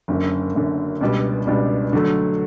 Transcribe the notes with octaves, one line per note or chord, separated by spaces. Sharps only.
F#1 F#2 D3
F#1 F#2 D3
C#2 B2 G3 D4
C#2 B2 G3 D4
D3 F#3 A3